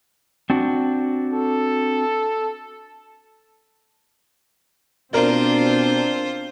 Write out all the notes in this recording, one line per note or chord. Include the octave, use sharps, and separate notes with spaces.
C4 D4 F#4
A4
B2 C4 D4 F4 A#4 C5 D5